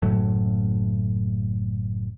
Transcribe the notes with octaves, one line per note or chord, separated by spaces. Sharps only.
F#1 A2 F#3 A3